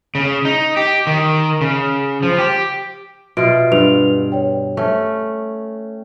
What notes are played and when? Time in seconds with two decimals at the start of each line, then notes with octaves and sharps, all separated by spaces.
0.15 C#3
0.45 D#4
0.77 G4
1.07 D#3
1.61 C#3
2.23 F3
2.38 G4
3.37 B2 F4 E5 D7
3.72 G2 B4 F7
4.32 C#5 D5 G5
4.77 A3 C#4